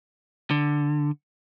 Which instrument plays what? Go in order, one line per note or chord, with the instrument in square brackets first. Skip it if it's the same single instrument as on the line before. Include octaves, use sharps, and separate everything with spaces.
[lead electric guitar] D3